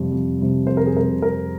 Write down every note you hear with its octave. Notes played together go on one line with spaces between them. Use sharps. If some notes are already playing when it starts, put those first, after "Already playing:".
Already playing: F2 C3 G3
F2
C3 G3
F2 C5
A#4
G#4
C3 G3 A#4
F2 A#4